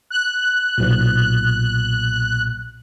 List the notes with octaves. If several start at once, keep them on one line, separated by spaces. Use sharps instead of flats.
F#6
B1 A#2